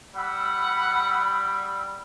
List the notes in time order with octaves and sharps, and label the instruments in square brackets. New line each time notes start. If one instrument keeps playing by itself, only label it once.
[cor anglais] G3 [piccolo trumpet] F#5 [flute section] B5 E6